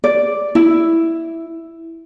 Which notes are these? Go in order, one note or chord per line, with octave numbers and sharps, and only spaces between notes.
D5
E4